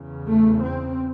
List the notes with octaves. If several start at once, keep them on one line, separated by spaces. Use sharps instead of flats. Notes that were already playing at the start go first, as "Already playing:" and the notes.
Already playing: E2 C#3
A3
C4